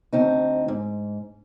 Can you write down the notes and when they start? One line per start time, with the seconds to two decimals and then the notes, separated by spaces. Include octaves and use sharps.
0.13 D2 C4 D#4
0.68 G#2